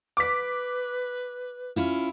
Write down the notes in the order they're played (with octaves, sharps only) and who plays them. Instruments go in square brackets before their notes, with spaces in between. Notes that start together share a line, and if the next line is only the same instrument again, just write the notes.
[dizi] B4 [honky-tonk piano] D6 B6
[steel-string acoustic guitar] C#4 E4 F4